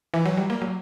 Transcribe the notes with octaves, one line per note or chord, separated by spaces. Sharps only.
E3
F#3
G3
A#3
F#3